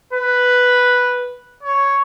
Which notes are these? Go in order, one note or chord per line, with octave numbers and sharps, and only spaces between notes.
B4
C#5